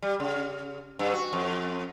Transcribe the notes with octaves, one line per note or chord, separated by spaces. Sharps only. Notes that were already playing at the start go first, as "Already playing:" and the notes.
G3
C#3
G2
F#4
F2